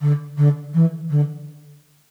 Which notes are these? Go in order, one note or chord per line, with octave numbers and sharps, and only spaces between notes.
D3
D3
E3
D3